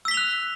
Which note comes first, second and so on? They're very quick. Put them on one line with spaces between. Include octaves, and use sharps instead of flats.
E6 B6 G7 F7 F#6